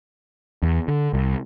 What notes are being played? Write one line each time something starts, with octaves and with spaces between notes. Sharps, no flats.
E2
D3
C2